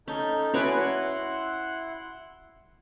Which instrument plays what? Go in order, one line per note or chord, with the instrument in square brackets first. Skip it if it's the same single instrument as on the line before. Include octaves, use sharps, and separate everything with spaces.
[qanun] C#4 [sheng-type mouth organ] D#4 A4 G6
[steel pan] C#4 B4 [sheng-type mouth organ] E4 F#5 C6 [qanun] F#4 C#5 D5